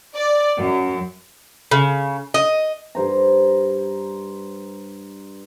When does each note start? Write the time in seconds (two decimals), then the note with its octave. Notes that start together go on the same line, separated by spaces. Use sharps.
0.15 D5
0.58 F#2
1.71 C#3
2.34 D#5
2.95 G2 C5 A#5